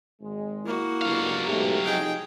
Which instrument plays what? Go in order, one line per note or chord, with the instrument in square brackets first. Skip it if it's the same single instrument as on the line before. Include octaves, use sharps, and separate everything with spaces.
[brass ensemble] G#1 G#3
[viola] A#3 F#4 [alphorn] E4
[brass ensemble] G1 C#2 D3 [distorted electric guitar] F#3 F5
[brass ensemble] B1 G#2 A3 [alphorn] G4
[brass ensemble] C2 F3 D#4 [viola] G#4 G5